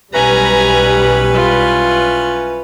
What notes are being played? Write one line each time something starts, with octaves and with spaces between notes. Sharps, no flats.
B1 G3 C#4 E4 B4 G#5 A#5
F4